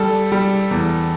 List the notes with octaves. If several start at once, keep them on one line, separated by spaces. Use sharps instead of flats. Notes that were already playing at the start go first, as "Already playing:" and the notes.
Already playing: G3 A4
G3
E2